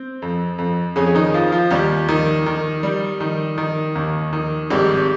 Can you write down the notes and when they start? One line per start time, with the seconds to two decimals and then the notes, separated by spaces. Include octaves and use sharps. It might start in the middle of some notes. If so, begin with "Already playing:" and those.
Already playing: C4
0.22 F2
0.58 F2
0.96 F2 C#3 C#4
1.15 D#3 D#4
1.34 F3 F4
1.52 F3 F4
1.71 D#2 G3 G4
2.09 D#3
2.46 D#3
2.83 G3
3.20 D#3
3.58 D#3
3.95 D#2
4.33 D#3
4.70 G#1 G3 G4